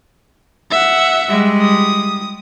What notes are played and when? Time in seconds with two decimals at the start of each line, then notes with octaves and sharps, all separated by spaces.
0.71 E5 F#5
1.28 G3 G#3
1.61 D#6